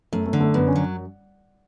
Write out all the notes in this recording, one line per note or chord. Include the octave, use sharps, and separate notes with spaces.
F#2 A3
A3
D3
A3
F#2 B3
C#4
F#3